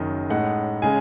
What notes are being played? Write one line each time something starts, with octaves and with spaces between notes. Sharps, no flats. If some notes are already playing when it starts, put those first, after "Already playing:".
Already playing: F#1 F#2 D#3 D#5
A2 G#3 D#4 F#5
C#3 G#3 G#5